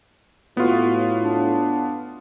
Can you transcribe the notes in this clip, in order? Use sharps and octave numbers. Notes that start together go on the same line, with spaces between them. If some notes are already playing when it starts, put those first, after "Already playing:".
A2 B3 F4 F#4
D4